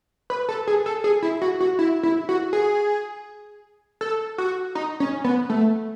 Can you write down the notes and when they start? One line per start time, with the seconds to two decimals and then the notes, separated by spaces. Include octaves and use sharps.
0.30 B4
0.49 A4
0.67 G#4
0.86 A4
1.04 G#4
1.22 E4
1.42 F#4
1.60 F#4
1.79 E4
2.03 E4
2.29 F#4
2.53 G#4
4.01 A4
4.38 F#4
4.75 D#4
5.00 C#4
5.24 B3
5.50 A3